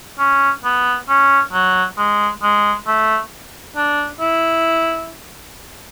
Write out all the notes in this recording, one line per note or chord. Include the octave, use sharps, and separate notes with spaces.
C#4
B3
C#4
F#3
G#3
G#3
A3
D4
E4